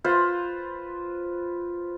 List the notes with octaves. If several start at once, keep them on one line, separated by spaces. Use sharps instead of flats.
F4 B4 C5